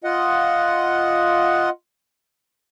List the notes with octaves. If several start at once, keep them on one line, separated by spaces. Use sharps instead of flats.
F4 D#5 F#5